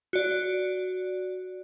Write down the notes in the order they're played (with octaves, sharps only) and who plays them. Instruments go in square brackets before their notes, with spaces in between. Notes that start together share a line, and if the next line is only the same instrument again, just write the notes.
[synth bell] F#4 D5